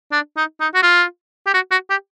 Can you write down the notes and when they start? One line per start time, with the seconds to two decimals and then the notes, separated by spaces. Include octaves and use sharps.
0.12 D4
0.37 D#4
0.60 D#4
0.74 F#4
0.83 F4
1.46 G4
1.54 F#4
1.71 F#4
1.90 G4